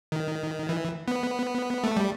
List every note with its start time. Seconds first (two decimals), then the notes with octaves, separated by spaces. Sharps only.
0.12 D#3
0.69 E3
1.08 B3
1.84 A3
1.97 G3